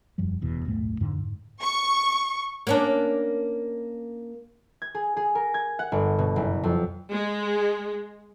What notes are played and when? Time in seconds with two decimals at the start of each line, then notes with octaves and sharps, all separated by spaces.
0.18 E1 F#2 F3 G3
0.41 F1 E2 B2
0.65 D#1 B1 G#2 A3
1.01 F2 G#2 D3
1.18 G#2
1.61 C#6
2.67 A#3 C#4 D4
4.82 G#6
4.95 G#4
5.17 G#4
5.35 A#4
5.54 G#6
5.79 F#5
5.92 G1
6.19 B2
6.36 F#1
6.64 F2
7.12 G#3